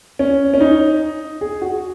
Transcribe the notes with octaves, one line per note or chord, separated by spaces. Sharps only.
C#4
C#4
D#4
G#4
F#4